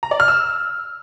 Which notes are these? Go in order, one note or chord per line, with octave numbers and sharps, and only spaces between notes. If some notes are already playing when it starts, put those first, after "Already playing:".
A#5
D5
F6
E6